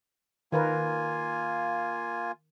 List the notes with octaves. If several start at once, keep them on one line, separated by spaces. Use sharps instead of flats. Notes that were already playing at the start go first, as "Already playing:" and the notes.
D#3 A#3 F4 A#4 B4 G#5